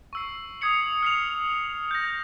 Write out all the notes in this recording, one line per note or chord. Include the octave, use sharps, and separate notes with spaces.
C#6 E6 C7
D#6 G#6 C7 C#7 F#7
F6 C7 F7
G6 A#6